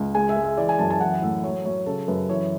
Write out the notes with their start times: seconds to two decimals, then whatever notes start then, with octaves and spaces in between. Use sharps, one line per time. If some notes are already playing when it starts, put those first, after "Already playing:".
Already playing: C#2
0.15 G#3 G#5
0.29 E5
0.36 G#3
0.44 E5
0.57 E3 D5
0.69 G#5
0.79 F#2 A5
0.90 A5
1.00 E3 F#5
1.22 A2 E5
1.43 F#3 C#5
1.65 F#3 C#5
1.86 C#3 A4
2.08 F#2 B4
2.29 E3 C#5